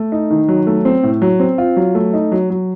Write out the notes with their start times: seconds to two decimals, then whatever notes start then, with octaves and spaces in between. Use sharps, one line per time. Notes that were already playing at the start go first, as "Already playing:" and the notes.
Already playing: A3
0.12 D#4
0.30 D#3
0.48 F#3
0.67 A3
0.85 C4
1.03 A2
1.22 F#3
1.40 C4
1.58 F4
1.76 F#3
1.95 A3
2.13 D#4
2.32 F#3
2.50 F#3